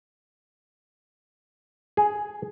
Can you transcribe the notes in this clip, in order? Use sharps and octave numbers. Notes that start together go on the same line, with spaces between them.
G#4